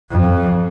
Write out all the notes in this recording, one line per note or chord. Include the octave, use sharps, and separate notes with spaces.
F2